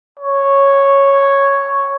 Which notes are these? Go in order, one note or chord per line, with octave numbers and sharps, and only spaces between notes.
C#5